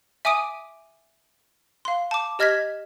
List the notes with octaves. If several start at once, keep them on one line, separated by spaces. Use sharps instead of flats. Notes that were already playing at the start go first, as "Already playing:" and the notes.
E5 G#5 D6 D#6 D7 D#7
F5 C6
A5 D6
G4 D#5 F6 G#6 A#6 B6